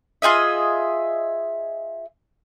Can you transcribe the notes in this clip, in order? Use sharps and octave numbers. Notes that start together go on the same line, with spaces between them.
F4 G#4 D#5 E5